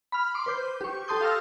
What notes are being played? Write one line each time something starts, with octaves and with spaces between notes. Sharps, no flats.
B5 F6
C6 D6
B4 C5 G6
G4 C#6
G4 A4 A5 C6 D#6 G6
F5 A5 C#6 E6 F6 A#6